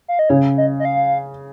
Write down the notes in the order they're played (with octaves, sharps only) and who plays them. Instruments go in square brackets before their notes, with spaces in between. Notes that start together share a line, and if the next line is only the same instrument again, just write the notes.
[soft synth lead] F5
D#5
[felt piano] C#3 [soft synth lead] C#5
[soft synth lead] D#5
D#5
F5